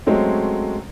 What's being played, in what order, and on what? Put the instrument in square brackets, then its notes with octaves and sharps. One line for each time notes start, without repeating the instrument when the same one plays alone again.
[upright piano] F#3 G#3 A3 C4 C#4